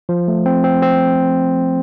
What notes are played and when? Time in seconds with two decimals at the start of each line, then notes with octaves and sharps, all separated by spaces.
0.09 F3
0.28 A3
0.46 C4
0.64 C4
0.82 C4